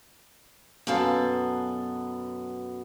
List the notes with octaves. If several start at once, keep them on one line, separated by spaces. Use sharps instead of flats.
F#2 B2 B3 A4 F5 A5